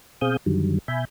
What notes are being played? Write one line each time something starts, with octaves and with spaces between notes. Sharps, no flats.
B2 C4 G#4 F5 D#6 G6
F#2 D3 D#3 F#3 G3
B2 E5 G#5 B5 G6